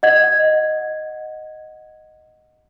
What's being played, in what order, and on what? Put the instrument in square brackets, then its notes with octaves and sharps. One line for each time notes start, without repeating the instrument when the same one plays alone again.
[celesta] D#5 F#5 G#6